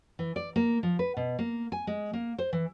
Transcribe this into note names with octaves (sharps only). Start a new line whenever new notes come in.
E3
D5
A#3
F3
B4
B2
A#3
G#5
G#3
A#3
C5
E3